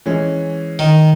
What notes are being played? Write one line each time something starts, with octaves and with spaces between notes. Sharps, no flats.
E3 G#3 C#4
D#3